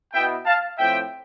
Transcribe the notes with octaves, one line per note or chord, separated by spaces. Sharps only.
B2 B3 E4 E5 G5
F5 A5
A2 F3 C4 E5 G5